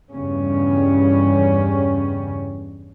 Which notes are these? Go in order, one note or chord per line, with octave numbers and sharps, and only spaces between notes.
E2 G2 C#3 G3 C#4